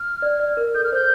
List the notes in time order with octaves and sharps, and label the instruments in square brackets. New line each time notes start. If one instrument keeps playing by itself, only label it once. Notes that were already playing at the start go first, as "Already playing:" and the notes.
Already playing: [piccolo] F6
[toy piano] D5
D5
A#4
[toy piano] A4 [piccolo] G6
[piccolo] F6
[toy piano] C5 [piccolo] G6